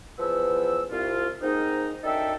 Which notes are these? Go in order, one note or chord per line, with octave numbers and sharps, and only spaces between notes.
E2 F3 B3 E6
C2 F4
G#2 A#3 C4 D#4
F#2 D4 D#4 A4 E5 G5